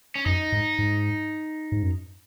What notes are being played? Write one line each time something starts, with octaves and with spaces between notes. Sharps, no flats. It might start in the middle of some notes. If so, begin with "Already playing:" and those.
C#4
F#2 D#4
G#2
G#2
G#2
F#2